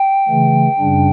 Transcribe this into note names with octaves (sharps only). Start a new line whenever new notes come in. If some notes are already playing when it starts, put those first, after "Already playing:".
Already playing: G5
C#3 E3 A3
F#2 C#3 G3 D4